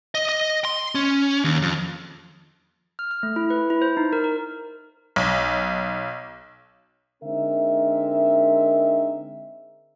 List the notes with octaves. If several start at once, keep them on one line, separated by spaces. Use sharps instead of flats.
D#5
D#5
C6
C#4
D#2
F2
F6
F6
A3
E4
B4
E4
C5
D#4
A#4
A#4
B1
D3 G#3 C4 D#4 A#4 E5